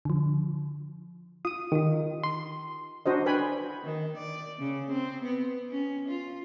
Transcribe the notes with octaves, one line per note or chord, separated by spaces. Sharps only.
D3 F3
F4 D#6 D#7
D#3 F4 G4
C6
D4 F#4 C5 D#5
B4 G5 G#5 B5
D#3
D5
C#3
C4
B3
C#4
F4